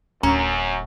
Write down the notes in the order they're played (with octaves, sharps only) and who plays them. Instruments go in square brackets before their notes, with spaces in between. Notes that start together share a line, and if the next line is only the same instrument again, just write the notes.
[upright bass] D1 [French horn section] F#2 [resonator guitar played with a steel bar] C#4 [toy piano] A#5